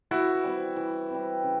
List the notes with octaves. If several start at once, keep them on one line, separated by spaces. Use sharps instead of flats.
E3 E4 F#4
G3 C4
E3
G3 C4
C#3